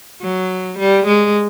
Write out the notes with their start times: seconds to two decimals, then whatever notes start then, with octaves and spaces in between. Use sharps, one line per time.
0.22 F#3
0.78 G3
1.06 G#3